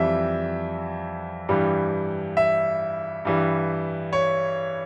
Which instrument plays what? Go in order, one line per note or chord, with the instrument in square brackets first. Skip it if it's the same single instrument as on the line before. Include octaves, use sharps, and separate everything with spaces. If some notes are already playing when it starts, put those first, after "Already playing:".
Already playing: [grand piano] F2 E3 G3 E5
G2 E3 G3
E5
G2 E3 G3
C#5